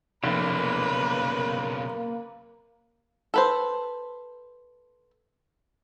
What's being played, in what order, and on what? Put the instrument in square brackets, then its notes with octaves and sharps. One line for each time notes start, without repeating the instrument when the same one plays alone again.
[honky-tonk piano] F1 [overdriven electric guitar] B1 C#3 [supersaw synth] A#3 [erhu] B4
[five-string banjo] A4 B4 C5